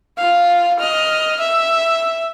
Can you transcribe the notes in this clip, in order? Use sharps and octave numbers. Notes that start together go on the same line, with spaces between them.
F4 F5
D#5 F6
E5